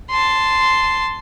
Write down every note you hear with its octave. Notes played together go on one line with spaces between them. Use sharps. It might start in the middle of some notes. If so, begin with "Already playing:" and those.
A5 C6